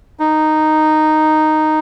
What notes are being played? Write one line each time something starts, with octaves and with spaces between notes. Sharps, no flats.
D#4